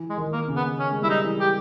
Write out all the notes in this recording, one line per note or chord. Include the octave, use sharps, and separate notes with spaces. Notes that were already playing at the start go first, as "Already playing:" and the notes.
Already playing: E3
G#3
D#3
A#3
C#3
B3
C#4
G#3
G3 E4
D#4
E3
G4